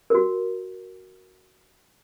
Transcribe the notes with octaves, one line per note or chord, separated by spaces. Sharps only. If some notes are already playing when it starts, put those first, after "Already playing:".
F#4 A#4